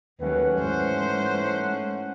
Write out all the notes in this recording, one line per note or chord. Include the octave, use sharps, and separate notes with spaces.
D#2 F#3 A3 C#4 B4 F#5
G#2 E3 C5